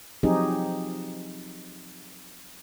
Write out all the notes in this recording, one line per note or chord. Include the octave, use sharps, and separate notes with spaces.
F3 F#3 C4 D#4 G4 G#4